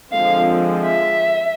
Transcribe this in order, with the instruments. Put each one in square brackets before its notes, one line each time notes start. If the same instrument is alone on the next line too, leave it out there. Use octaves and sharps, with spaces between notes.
[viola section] D3 F3 G#3 C4 [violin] F5
[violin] E5